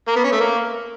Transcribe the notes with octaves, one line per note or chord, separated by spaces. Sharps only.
A#3
B3
C#4
A3
A#3